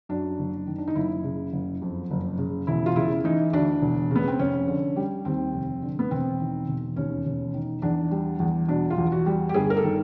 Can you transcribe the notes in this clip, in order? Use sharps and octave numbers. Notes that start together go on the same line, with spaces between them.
F#2 D4
F#1
D#3
D4
D#4
F#1 E4
C#3
F#1
F2
F#1
C#3
E1 E4
F4
C#3 E4
E3 D#4
D2 D4
E1
C#3 B3
C4
F1 C#4
D3
G3
D#2 C4
F1
D3
B3
E1 C4
D#3
E1
D#2 C#4
E1
D#3
E2 D4
G3
E2
B2 D4
F4
E2
F#4
G3
G4
G1 G#4
A#4
A4
D#3